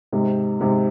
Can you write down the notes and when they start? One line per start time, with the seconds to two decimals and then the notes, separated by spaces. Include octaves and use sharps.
0.12 G#2 C3
0.61 G#2 C3